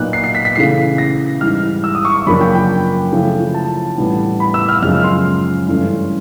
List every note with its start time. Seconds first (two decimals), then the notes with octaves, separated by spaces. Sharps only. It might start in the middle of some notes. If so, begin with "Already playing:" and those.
Already playing: A#2 F#3 B3 D#4 F#6
0.13 C7
0.24 C7
0.35 B6
0.45 B6
0.56 C#3 E3 A3 C7
0.98 A#6
1.41 G#2 E3 G3 F6
1.84 E6
1.95 D#6
2.05 C#6
2.16 C#6
2.27 F#2 C#3 F3 A#3 D4 B5
2.41 G5
2.55 G5
3.12 C#3 F3 A3 C#4 E4
3.55 A5
3.97 A2 E3 G3 B3 D4
4.40 B5
4.54 E6
4.69 F6
4.82 F#2 C#3 F3 G#3 F6
5.04 C6
5.68 G2 E3 A3 C#4